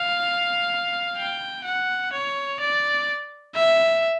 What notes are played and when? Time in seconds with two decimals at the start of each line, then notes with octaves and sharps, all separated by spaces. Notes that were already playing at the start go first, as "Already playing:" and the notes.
Already playing: F5
1.18 G5
1.65 F#5
2.13 C#5
2.60 D5
3.56 E5